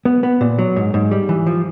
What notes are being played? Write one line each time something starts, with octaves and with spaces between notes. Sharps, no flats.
B3
B3
A#2
F#3
G#2
G#2
G3
E3
F3